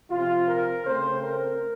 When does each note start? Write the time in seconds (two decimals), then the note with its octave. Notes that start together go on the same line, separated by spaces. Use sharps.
0.11 C3 F3 C4 F4
0.48 A#4
0.85 C#3 A3 C4 C5
1.23 A#4